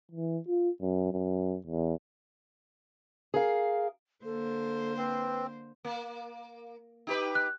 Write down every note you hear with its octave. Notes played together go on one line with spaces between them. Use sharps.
E3
F4
F#2
F#2
E2
G#4 A#4 F5
D3 A#3 A4 C5
C4 B4
A#3
D#4 G4 B4
F#6